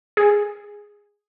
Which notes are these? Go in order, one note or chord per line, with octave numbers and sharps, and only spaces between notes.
G#4